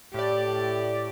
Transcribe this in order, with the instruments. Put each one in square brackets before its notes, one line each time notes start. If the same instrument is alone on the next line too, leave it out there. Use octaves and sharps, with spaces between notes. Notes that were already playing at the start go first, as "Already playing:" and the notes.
[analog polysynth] A2 D5 [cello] G4